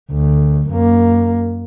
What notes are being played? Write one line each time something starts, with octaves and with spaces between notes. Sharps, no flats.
D2
F#2 A#3